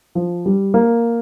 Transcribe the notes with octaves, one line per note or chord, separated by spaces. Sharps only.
F3
G3
A#3